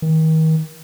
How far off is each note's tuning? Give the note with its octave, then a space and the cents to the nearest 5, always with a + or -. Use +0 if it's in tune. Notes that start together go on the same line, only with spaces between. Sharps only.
D#3 +35